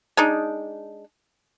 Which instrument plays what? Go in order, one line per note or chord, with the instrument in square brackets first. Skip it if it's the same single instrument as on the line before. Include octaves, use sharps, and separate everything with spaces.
[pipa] G#3 D4 D#4